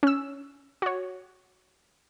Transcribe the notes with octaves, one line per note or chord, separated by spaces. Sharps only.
C#4 E6
F#4 C#5